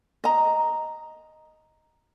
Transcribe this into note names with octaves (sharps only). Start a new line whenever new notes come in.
D#5 A#5